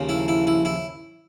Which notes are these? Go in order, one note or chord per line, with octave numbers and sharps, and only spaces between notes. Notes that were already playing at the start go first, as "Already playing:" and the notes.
Already playing: D#2 C#3 F3 A#3
E4
E4
E4
E4